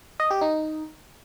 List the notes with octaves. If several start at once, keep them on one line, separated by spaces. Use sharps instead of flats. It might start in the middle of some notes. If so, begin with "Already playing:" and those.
D#5
G4
D#4